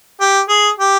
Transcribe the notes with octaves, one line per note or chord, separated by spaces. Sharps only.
G4
G#4
G4